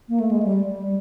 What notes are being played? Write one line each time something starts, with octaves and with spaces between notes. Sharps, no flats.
A#3
A3
G#3
G3
G3